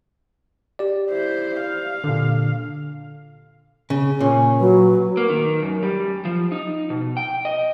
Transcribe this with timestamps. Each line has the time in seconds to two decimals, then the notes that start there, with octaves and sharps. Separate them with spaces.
0.79 G4 D5
1.10 E4 C5
1.61 F5
2.04 A#2 D3
3.90 C#3
4.21 A#2 C#4
4.60 F#3 B4
5.17 A#3
5.29 D#3
5.63 F#2
5.83 G3
6.25 F3
6.52 D#4
6.90 B2
7.17 G5
7.45 D#5